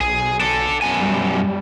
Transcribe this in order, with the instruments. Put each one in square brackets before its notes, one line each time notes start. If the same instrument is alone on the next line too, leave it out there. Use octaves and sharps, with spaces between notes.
[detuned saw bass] B1 [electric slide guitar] G#4
[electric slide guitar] D4 A4
F#2 B2 G#5
[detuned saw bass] G3